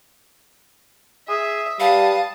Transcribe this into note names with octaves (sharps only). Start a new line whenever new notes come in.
G#4 E5
G3 B4 F5 A5 D#6